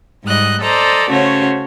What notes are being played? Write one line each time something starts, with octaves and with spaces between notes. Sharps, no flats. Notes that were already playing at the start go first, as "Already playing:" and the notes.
G#2 G3 D#5 F#6
A4 C5 D5 D#5 A#5
C#3 A3 C#4 F#4 C5 C#5